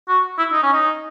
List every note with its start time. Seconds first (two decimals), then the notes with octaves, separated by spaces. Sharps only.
0.09 F#4
0.38 E4
0.53 D#4
0.63 C#4
0.73 D#4